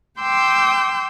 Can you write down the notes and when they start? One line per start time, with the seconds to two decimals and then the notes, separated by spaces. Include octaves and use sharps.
0.20 G5 C6 D6 E6 G6